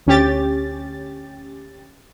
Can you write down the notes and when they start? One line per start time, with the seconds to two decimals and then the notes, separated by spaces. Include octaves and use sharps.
0.07 D2 C#4 G4 A6